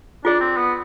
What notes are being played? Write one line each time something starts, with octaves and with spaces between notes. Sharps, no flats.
D4 F4 G#4 D5
C4
B3